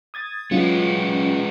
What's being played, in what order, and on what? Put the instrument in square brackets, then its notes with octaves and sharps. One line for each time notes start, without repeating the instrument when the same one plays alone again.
[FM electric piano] D#6 G#6 A6
[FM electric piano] F#3 C#4 F4 [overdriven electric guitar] G#3 B3